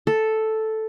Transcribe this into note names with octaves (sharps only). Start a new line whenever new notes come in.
A4